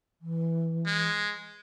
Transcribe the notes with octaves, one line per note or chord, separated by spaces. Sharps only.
E3
G#3